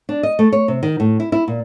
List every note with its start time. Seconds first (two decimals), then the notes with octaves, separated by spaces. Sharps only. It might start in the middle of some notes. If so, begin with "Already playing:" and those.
0.09 D4
0.23 D#5
0.39 A3
0.52 C#5
0.68 C3
0.83 D#3
1.00 A2
1.20 E4
1.32 E4
1.48 A#2